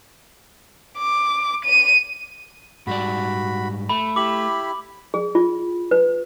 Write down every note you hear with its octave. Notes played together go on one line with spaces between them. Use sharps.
D6
D#7
G#2 G3 F#4 D5 B5
A3 B5
E4 G4 B5 D6 F#7
G#4
F4
B4